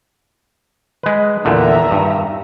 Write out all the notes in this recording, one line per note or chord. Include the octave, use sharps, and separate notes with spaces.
G#3 B4
E2 A#2 D3 D#3 E5 A#5
G2